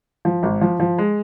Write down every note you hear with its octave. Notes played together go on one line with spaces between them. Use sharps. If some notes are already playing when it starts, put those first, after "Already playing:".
F3
G#1
F3
F3
G#3